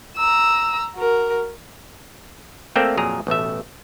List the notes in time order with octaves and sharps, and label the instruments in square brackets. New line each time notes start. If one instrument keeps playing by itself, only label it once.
[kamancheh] A#5 E6
F#4 A#4
[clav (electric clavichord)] A3 A#3 C4 D5 E5 G5
F2 A#2 F#3 G#4 A#4 A#5
A1 B2 A3 E5